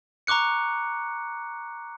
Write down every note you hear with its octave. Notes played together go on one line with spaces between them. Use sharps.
A#5 C#6 D6 F#6 C#7